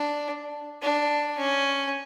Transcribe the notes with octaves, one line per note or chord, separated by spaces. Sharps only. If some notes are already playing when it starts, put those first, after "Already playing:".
Already playing: D4
D4
C#4